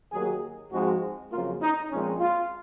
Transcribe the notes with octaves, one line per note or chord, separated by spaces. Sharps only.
D#2 D#3 F#3 A#3 G#4
G#2 F3 G#3 C4 F#4
F2 C#3 F#3 A#3 F4
D#4
A#2 F3 G#3 C4 C#4
F4